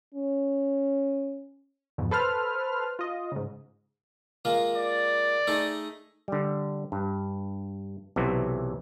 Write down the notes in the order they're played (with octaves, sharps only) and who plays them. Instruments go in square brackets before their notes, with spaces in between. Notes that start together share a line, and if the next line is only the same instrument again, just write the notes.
[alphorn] C#4
[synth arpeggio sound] F2 G#2 B2
A4 B4 C5 F6
F4 D#5
G#2 C#3
[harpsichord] G#3 A#3 F4
[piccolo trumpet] D5
[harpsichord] A3 D#4 G#4
[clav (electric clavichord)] D3 G3
G2
B1 C3 E3 F#4